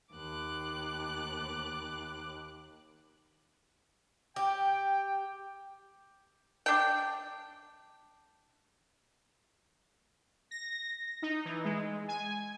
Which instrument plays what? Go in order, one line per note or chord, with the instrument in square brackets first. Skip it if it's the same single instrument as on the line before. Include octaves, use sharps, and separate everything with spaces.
[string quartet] D#2 D6 F#6
[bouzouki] G4 [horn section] G5
[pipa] D4 G5
[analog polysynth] A#6
D#4
E3
G#3
G#5